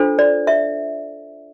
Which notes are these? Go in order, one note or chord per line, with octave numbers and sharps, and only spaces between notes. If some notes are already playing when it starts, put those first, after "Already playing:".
Already playing: D4 F4 A4 C5
D5
E5